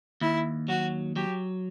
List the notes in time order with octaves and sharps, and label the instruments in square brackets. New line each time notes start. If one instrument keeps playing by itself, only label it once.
[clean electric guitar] D#2 [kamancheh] E4
[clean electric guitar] F#3 [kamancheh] F#4
[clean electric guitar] F#3 [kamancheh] G4